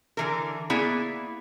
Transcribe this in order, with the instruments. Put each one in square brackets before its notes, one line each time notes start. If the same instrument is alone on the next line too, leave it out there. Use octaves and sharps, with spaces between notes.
[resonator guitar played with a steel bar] D3 E3 A#4
A#3 B3 E4 G#4 D5